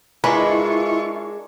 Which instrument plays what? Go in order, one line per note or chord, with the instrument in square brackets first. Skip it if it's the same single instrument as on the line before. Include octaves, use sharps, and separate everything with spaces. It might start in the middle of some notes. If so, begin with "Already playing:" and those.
[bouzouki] G#3 D4 A#4 [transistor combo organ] E4 C#6 [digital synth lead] F4 [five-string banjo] B4